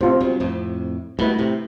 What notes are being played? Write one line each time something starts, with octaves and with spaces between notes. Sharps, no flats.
A2 C3 C4 F4 C5
G2 B2
F2 A2
G2 B2 A3 E4 B4
A2 C3